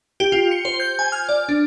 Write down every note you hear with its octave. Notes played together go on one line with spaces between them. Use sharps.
G4
F4
C#7
C5
G6
G#5
F6
D5
D4